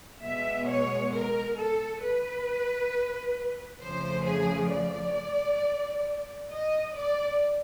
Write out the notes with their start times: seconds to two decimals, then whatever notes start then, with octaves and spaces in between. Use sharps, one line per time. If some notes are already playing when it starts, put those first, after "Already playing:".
0.22 B2 G#3 E5
0.66 C#5
1.11 A#4
1.56 A4
2.01 B4
3.81 F2 C#3 F3 A3 C5
4.26 G#4
4.71 D5
6.50 D#5
6.95 D5